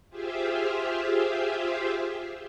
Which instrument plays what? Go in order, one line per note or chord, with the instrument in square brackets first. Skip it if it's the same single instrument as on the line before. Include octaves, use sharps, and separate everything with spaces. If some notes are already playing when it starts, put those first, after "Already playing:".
[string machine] F4 G4 G#4 C5 E5 F5